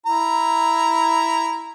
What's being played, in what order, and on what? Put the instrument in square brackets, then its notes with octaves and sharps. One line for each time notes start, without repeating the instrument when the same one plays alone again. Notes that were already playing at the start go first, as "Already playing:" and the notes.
[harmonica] E4 A#5